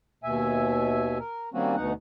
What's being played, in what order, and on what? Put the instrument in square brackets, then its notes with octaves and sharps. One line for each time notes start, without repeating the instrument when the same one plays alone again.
[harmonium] D#2 B2 E5 G#5
A#4
D#3 G3 A#3 C4 C#4 F#4
D2 B2 D#4 F#5